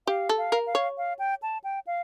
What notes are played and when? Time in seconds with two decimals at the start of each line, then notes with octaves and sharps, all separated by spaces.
0.07 G4 F5
0.29 A4
0.38 F5
0.52 A#4
0.67 F5
0.75 C#5
0.98 F5
1.19 G5
1.42 A5
1.64 G5
1.87 F5